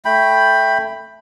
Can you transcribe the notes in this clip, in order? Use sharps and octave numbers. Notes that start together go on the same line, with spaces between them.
A3 G5 B5